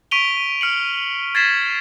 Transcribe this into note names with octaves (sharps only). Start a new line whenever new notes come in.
C#6 B6 D7 D#7 F7 G7
F6 C#7 F#7
G#6 A6 B6 C7 E7